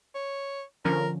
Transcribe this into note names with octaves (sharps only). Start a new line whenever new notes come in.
C#5
D3 F3 C#4 A#4